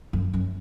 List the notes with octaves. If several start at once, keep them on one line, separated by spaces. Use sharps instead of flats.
F#2
F#2